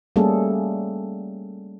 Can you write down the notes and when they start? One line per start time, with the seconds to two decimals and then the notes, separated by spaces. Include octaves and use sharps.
0.16 G3 A3 A#3 C#4 G#4 A4